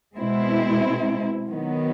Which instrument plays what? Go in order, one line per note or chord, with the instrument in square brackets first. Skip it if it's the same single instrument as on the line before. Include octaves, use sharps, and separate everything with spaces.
[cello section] B2 G#3 C4 E4
D#3 F#3 B3